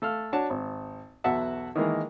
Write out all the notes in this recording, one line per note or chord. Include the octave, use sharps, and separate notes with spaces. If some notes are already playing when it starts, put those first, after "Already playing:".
A3 A4 F5 F6
D4 F#4 C#5 A5
G#1
B1 E2 F#4 E5 F#5 A5
D#3 E3 G#3 A#3